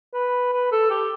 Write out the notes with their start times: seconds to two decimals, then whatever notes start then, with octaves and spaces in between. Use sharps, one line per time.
0.14 B4
0.53 B4
0.72 A4
0.90 G4